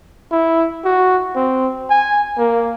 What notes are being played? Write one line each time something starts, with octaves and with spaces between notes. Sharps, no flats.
E4
F#4
C4
G#5
A#3